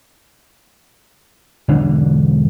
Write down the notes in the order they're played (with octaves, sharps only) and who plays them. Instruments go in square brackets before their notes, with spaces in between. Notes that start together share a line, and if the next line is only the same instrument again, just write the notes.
[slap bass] E1 D3 D4